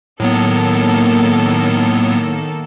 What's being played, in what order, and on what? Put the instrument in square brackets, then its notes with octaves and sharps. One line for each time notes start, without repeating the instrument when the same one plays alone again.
[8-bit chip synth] A2 F#3 B3 [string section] D#3 A#3 A4